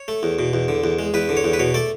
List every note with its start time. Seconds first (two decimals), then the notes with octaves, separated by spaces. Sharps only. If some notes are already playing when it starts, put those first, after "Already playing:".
Already playing: C#5
0.08 A3
0.23 E2
0.39 B2
0.53 E2
0.68 D3
0.84 E2
0.99 G#3
1.14 E2 B4
1.29 D3
1.37 C#5
1.44 E2
1.53 B4
1.59 B2 C#5
1.74 A3 D5